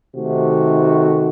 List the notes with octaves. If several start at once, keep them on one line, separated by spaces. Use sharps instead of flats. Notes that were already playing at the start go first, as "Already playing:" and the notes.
C3 D#3 A3 D#4 F#4